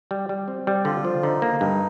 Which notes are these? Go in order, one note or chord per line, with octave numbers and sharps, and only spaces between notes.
G3
G3
C4
G3
D3 F4
F3
D3 D#4
A#3
G2 D#4